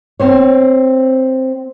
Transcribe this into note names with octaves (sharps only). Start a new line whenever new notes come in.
C4 C5 C#5